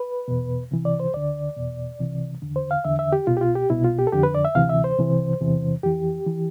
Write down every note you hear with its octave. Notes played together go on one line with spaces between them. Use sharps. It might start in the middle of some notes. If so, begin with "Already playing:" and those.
Already playing: B4
E2 B2
C2 C3 E3
D5
C5
D2 D3 D5
E2 B2
C2 C3 E3
E2 D3
C5
F5
E2 D3 E5
E5
G4
C2 B2 F4
G4
F4
G4
C2 B2 E4
F4
G4
A4
F2 D3 G4
B4
D5
E5
D2 C3 E3 F5
E5
C5
C2 C3 E3
E2 C3 E3
F2 E3 G4
E3